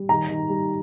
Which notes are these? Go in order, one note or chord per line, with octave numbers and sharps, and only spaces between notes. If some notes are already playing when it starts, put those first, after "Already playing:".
Already playing: G3
D#3 A#5
D#3
G3